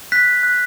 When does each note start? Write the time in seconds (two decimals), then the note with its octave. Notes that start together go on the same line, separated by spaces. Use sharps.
0.12 F#6 B6
0.43 F#6